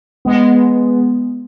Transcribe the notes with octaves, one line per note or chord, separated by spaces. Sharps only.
G#3 B3